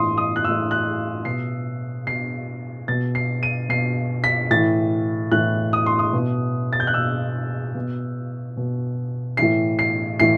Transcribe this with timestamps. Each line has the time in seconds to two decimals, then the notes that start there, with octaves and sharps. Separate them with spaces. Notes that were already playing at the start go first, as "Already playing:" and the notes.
Already playing: A2 E3 C6 D#6
0.18 D#6
0.36 F#6
0.45 A2 E3 E6
0.71 F#6
1.25 B2 C7
2.07 B2 C7
2.88 B2 A6
3.15 C7
3.43 D#7
3.69 B2 C7
4.24 B6
4.51 A2 E3 A6
5.32 A2 E3 F#6
5.73 D#6
5.86 C6
5.99 D#6
6.13 B2
6.73 A6
6.80 G6
6.87 F#6
6.94 B2 E6
7.75 B2
8.57 B2
9.37 A2 E3 C7
9.79 C7
10.19 A2 E3 C7